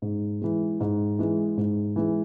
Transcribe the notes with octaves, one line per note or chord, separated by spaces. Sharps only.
G#2
E3 G#3
G#2
E3 G#3
G#2
E3 G#3